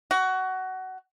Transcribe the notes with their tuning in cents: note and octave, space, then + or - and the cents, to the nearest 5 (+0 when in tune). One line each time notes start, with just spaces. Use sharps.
F#4 +20